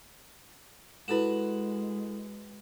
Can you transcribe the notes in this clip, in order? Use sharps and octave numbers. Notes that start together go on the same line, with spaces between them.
G#3 E4 F#4 A4 B4 E7